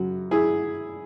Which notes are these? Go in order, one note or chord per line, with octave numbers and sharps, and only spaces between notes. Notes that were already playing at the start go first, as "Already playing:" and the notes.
Already playing: F#2 C#3 F#4
E4 G#4